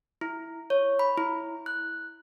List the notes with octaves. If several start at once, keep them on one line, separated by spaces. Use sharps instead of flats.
E4
C#5
B5
E4
F#6